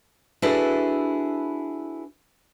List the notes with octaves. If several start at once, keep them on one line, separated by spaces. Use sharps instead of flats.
D4 E4 F#4 G#4 A4 B4